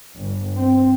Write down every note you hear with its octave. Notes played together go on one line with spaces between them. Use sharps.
G1
C4